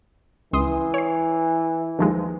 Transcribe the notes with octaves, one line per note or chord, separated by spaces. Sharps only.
C#2 E3 C6 D#6
C#5 C7
D#2 F3 G#3